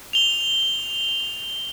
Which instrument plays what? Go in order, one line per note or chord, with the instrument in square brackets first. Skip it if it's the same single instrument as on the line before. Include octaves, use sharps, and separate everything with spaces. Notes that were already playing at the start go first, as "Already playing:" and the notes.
[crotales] F7 G7